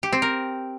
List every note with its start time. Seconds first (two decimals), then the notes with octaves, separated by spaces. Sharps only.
0.03 G4
0.13 C4
0.22 A#4